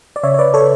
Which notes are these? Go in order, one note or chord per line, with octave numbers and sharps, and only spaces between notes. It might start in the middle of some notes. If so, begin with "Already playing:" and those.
D5
C#3 C#5 E5
C#5
B4 D5
A4 C#5